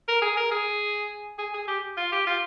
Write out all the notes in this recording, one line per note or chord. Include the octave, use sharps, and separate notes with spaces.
A#4
G#4
A#4
G#4
G#4
G#4
G4
F4
G4
F4